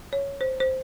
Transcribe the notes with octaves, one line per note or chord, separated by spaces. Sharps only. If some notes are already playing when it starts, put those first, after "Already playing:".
C#5
C5
C5